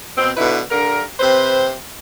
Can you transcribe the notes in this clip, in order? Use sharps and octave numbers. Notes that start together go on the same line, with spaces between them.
B2 C4
B2 D3 D#4 E4 B4
G2 D3 A#4
C3 C4 B4 C5